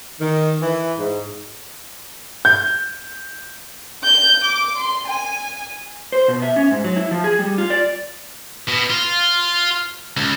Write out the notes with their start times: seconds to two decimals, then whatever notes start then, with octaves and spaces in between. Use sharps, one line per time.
0.21 D#3
0.62 E3
0.98 G#2
2.45 G6
4.04 G6
4.43 D6
4.77 C6
5.07 G#5
6.12 C5
6.28 B2
6.42 E5
6.56 C#4
6.71 G#2
6.84 F#3
6.96 E4
7.11 F3
7.24 G#4
7.39 G3
7.58 F4
7.70 D5
8.68 B2
8.90 F4
10.17 C#2